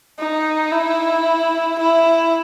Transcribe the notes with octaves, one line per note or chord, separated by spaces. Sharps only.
D#4
E4
E4